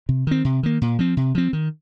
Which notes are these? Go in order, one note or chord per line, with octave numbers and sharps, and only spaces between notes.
C3
D#3 C4
C3
D#3 A#3
A#2
F3 C4
C3
F3 C4
D#3